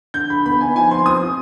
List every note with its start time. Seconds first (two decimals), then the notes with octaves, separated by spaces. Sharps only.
0.14 D3 G6
0.30 D3 B5
0.45 B3 B5
0.61 D#4 G#5
0.75 F3 G#5
0.91 C4 C6
1.06 F3 D#6
1.21 F3